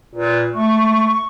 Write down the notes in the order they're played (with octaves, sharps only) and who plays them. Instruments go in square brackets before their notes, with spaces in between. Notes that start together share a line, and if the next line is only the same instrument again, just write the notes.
[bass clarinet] A#2 [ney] B4
[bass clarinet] A3 [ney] C#6